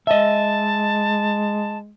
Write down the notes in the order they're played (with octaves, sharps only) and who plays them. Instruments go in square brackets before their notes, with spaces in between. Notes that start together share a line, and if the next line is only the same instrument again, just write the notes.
[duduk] G#3 [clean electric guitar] D#5 E5 [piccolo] A5